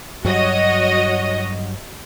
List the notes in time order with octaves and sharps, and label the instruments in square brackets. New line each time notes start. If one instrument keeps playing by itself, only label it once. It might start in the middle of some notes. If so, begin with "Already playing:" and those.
[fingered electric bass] G2 F#3 [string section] F#4 C#5 D#5